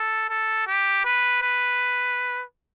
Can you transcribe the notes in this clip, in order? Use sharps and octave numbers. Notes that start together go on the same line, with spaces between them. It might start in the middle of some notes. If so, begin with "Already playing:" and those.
Already playing: A4
A4
G4
B4
B4